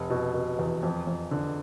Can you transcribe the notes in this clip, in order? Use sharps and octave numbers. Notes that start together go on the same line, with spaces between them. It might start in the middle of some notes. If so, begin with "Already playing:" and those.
Already playing: F1
B2
B2
E2
F2
F2
D3